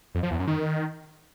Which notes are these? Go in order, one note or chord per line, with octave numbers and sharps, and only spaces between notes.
F2
F3
E2
F#2
D#3